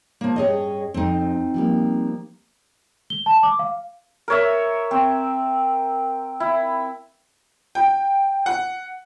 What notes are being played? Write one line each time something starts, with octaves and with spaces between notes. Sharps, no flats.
F3 A#3
G2 C#4 G#4 C#5 D#5
F2 C4 D#4
F3 G3 A#3
G7
A5
D6
F5
A#4 C#5 E5
C4
E4
G5
F#5